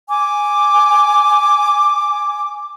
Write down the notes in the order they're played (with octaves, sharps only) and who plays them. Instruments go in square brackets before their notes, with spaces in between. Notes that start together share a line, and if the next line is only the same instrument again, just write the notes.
[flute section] G#5 D6